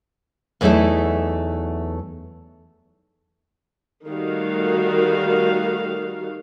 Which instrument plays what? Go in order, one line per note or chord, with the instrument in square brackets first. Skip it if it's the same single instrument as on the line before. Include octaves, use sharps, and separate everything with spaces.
[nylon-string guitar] E2 F#3 A3 D#4 E4 A4
[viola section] D#3 G3 A3 F#4 F5